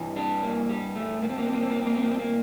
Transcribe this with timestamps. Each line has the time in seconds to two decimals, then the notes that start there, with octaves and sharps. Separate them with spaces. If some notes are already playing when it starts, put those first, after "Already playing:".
Already playing: G2 E3 G3
0.16 D4
0.43 A#3
0.70 G3
0.96 A3
1.22 A#3
1.29 C4
1.38 A#3
1.46 C4
1.54 A#3
1.63 C4
1.70 A#3
1.79 C4
1.86 A#3
1.95 C4
2.02 A#3
2.11 C4
2.19 A#3